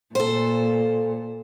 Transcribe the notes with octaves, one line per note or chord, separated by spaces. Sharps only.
A#2 A4 C5